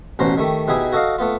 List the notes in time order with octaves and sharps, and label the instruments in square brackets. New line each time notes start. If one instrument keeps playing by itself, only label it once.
[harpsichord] A1 B2 C#4 C5 A#5 C6
D#3 G3 A3
B2 G3 D#4 E4 G#4
F#4 A4 D#5 F5
A3 B3 F4